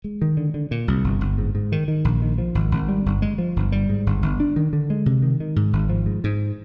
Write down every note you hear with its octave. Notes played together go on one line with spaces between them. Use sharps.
G#3
D#3
D3
D3
A#2
C2
G1
G1
G#2
G#2
D#3
D#3
A#1
D#3
F3
G#1
G#1
G3
G1
G#3
F3
G1
G3
G#2
G1
G1
D4
D#3
D3
G#3
C3
D#3
D#3
G#2
G#1
F3
G#2
G#2